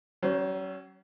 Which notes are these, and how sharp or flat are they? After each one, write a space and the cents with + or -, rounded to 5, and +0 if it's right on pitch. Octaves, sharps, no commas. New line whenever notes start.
F#3 +35 C#4 -5 C5 +0